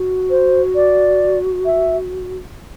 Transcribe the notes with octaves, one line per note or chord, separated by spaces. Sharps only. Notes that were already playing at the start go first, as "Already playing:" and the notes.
Already playing: F#4
C5
D5
E5